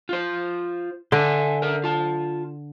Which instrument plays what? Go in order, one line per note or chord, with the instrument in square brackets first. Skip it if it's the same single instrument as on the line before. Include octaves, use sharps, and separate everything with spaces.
[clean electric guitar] F4 C5
[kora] D3 [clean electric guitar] E5 G#5 C6
[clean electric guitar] A#4 E5
F4 A5